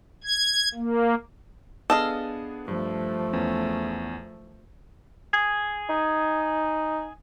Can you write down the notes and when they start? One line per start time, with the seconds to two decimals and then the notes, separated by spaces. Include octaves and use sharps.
0.24 G#6
0.75 A#3
1.90 B3 D4 G#4 A4 D#5 F5
2.68 G2 F3 A3
3.33 E2 B3 C#4
5.33 G#4
5.89 D#4